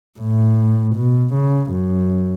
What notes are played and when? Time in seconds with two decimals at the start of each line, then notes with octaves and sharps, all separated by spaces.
0.19 A2
0.95 B2
1.33 C#3
1.71 F#2